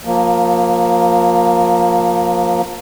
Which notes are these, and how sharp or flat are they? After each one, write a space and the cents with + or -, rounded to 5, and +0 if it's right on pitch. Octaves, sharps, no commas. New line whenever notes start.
F3 +25 A#3 +0